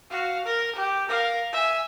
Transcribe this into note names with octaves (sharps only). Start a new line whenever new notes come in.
F#4 F5
A#4
G4
A#4 F5
E5 G#5